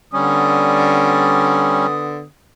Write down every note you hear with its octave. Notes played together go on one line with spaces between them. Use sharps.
D3 G3 B3 C#4 D#6